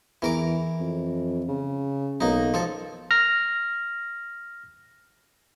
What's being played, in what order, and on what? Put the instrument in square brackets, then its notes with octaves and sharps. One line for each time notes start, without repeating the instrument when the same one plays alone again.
[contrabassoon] E2 [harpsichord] E3 A#4 D6
[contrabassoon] F2
C#3
[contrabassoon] B1 [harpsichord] A#3 D#4
[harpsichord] F3 A4
[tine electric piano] F6 A#6